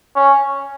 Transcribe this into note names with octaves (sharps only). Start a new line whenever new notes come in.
C#4